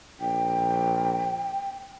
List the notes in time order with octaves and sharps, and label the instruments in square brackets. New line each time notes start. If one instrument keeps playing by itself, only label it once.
[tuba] A#1 [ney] G5